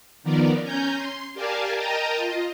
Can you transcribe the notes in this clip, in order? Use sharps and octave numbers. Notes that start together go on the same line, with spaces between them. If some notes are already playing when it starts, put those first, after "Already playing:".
D#3 F3 B3 A#4 D5
C#4 G#5 A#5 G6
C6
G4 A#4 D5 F5 G#5 A5
A#4 D#5 G5 A5 A#5 D#6
F4 D#5